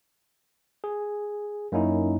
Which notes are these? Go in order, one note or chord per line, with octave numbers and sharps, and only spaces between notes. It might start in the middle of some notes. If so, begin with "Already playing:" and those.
G#4
F#2 A#3 C#4 D#4 E4